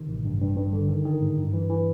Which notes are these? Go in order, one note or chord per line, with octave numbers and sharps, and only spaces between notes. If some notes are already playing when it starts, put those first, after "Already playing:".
Already playing: C3 D#3
A1
G2
G2
G2
D3
D#3
D#3
G#2
G2
E3
E3